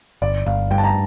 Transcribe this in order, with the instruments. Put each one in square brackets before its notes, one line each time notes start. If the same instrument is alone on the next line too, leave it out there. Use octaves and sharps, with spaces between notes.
[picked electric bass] G1 [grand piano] D5
[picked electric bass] G1 [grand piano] F5
[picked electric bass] G2 [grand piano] G5
[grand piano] A5
A#5